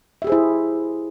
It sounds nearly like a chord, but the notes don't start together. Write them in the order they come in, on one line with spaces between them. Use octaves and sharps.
E5 G4 G#4 C5 E4